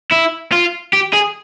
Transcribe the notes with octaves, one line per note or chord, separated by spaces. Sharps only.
E4
F4
G4
G#4